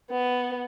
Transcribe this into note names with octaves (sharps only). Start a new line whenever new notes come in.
B3